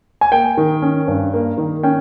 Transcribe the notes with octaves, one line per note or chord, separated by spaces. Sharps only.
G#5
A#3 G5
D#3
C#4
G2
A#3
D#3
C#4 G5